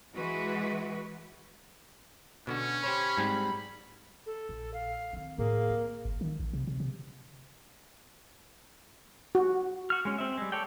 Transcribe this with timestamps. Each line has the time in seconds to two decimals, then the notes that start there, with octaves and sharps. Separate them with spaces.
0.15 E3 G#3 F#4 B4
2.47 B2 D3 C#4 F#4
2.84 G4 C5 C#5 B5
3.18 G#2 G3 C4
4.26 A4
4.49 A#1
4.74 F5
5.13 D#3 C4
5.38 A2 A#3 G#4
5.70 C4
6.05 G1
6.21 D#3
6.40 A#1
6.53 C3
6.67 C3
6.80 C3
9.35 F#4
9.90 F#4 F6
10.05 G#3 C#4
10.18 C4 E5
10.38 G3 G#3
10.52 A4 C#5 D5 G5